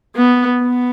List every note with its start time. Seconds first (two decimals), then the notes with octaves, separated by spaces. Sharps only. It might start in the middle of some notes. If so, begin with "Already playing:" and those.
0.16 B3
0.61 B3